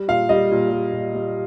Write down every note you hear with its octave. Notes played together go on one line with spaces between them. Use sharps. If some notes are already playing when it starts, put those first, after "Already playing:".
Already playing: G3
A#2 F5
G3 D#5
A#2
G3
A#2
G3